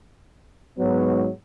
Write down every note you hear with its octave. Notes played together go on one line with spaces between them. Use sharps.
G#2 F#3 B3